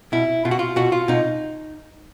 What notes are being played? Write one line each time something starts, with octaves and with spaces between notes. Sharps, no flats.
B2 E4
B2 F4
F#4
F4
B2 F#4
F4
B2 D#4